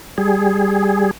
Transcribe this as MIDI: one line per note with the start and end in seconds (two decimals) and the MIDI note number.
0.18 1.11 55
0.18 1.11 68